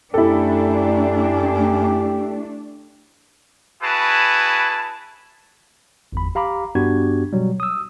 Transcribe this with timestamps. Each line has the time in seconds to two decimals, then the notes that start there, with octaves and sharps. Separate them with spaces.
0.14 F#2 A3 D4 E4 G4 A4
3.83 E4 F#4 G#4 B4 A5
6.13 G1 E2 B5
6.35 G4 F5 A#5 B5 D6
6.75 G2 B3 D4 F#4 G4 G#6
7.33 B2 F#3 G3
7.60 D#6 E6